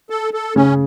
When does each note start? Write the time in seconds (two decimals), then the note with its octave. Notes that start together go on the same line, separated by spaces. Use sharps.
0.10 A4
0.34 A4
0.56 C#3 C#4